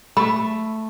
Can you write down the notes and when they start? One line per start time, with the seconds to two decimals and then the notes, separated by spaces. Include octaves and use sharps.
0.17 A3 B5